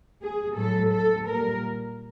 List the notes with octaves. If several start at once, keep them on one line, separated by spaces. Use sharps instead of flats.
G#4
A2 F#3 A3 A4
A4
A#2 G3 A#4